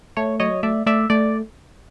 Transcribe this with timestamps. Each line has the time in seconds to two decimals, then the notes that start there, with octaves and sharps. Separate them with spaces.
0.17 A3 C#5
0.40 F#3 C#5 D#5
0.63 A3 D5 E5
0.86 A3 D5 E5
1.10 A3 D5